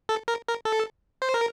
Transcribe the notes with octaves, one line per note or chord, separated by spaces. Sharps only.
A4
A#4
A#4
A4
C5
A#4